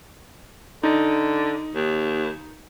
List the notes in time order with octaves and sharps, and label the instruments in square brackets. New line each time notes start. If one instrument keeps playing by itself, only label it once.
[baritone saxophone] D3 [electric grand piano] D#4
[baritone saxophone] D#2